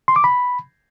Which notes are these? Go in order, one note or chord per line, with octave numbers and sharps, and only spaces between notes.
C6
D6
B5